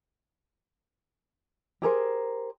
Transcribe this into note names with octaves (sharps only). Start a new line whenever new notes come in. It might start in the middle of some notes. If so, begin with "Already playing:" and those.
G4 G#4 A#4 C5